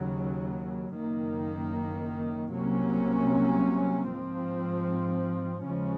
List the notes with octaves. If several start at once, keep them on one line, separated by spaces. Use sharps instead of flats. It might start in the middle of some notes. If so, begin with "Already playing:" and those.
Already playing: D#2 C#3 F#3
F#1 F#2 D#3 A#3
C2 C3 F#3 A#3 C#4
G#2 F3 C4
D#2 C#3 F3 G#3 C#4